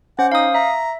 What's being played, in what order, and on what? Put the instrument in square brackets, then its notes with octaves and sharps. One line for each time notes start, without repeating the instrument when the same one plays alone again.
[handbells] C#4 C5 [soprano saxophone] F#5
[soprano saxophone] D#4 [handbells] F5 D#6
[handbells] E5 [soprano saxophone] A#5